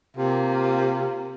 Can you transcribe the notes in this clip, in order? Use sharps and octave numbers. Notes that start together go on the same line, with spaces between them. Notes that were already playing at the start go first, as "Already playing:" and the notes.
C3 A#3 F4